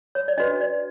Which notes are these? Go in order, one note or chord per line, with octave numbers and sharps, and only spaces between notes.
C#5
D5
D4 F#4 B4 D#5
D5